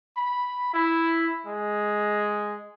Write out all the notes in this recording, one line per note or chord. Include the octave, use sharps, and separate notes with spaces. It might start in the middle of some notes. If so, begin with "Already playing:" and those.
B5
E4
G#3